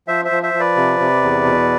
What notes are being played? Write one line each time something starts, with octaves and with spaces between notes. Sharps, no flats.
F3 C5 E5
C5 E5
F3
C5 E5
F3
B4 D5
C3
C3
E2
B2